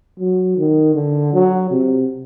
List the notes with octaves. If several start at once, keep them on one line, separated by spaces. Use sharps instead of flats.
F#3
D#3
D3
F#3
C3